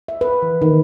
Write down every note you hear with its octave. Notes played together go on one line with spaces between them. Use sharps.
E5
B4
E3
D#3